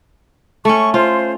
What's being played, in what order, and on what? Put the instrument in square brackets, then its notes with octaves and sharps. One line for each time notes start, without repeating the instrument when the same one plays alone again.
[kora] A3 C#4 [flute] C#6
[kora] F4 [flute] C5